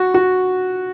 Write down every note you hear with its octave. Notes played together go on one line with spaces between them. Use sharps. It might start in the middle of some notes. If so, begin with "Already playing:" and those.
Already playing: F#4
F#4